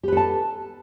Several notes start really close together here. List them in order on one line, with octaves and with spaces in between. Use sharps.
G4 B4 A4 A5